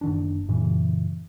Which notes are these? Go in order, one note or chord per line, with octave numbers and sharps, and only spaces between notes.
F#1 D#3 D4
F#2 A#2 C#3 E3